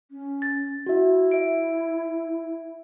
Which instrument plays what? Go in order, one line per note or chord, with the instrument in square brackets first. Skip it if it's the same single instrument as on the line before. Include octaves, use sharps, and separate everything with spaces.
[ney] C#4
[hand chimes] A6
[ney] E4 [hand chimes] F#4 E5
[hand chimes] E5 D7